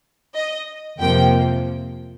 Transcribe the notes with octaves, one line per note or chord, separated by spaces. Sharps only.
D#5
F2 C3 F3 A#3 G5